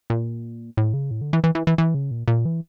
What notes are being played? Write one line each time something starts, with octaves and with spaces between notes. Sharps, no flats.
A#2
A2
C#3
A2
D3
E3
E3
E3
E3
E3
C#3
A#2
A#2
E3